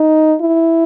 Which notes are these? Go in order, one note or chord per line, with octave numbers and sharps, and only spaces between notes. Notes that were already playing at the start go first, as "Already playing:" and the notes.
Already playing: D#4
E4